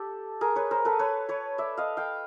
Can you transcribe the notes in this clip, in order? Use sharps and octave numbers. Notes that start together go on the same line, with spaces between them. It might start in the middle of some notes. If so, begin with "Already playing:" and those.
Already playing: G4 A4
G#4 A#4
B4 C#5
A#4 C5
A4 B4
B4 C#5
B4 C#5
D5 E5
D#5 F5
F5 G5